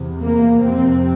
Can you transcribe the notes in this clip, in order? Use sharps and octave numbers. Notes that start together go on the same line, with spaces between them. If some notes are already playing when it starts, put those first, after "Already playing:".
Already playing: E2 C3
A#3
F2 C3 C4